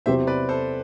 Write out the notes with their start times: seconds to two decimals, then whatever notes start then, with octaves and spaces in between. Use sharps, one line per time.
0.06 E2 C3 F#3 C4 G4 C5 E5
0.27 B4 D5
0.49 A4 C5